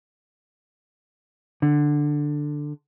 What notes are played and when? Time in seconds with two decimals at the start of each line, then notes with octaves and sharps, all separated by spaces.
1.62 D3